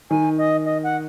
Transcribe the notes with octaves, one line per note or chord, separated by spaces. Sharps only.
D#3 G#5
D#5
D#5
F#5